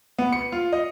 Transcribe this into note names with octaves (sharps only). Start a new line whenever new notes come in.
B3
C#7
F4
D#5